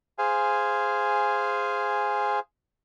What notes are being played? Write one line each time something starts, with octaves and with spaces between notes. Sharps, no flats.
G#4 C5 F5 G#5